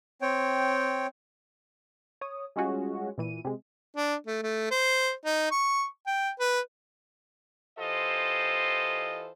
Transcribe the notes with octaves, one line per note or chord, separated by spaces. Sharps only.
C4 C#5 G5
C#5 D#6
G3 G#3 C#4 F4 F#4 G#4
A#2 E3 D#7
C3 G#3
D4
A3
A3
C5
D#4
C#6
G5
B4
E3 F4 G4 A4 C5 D#5